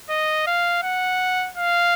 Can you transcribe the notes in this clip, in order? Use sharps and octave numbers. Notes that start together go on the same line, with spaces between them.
D#5
F5
F#5
F5